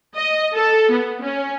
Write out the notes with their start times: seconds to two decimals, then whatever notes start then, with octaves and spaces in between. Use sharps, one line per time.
0.15 D#5
0.55 A4
0.90 B3
1.21 C#4